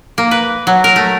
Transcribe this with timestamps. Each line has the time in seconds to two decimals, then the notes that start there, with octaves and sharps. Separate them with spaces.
0.18 A#3
0.31 B4
0.67 F#3
0.84 A#4
0.96 A3